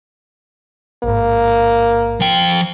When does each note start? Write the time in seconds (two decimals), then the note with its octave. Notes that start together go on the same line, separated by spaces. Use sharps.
1.04 A1 G#2 A#3
2.20 F3 G5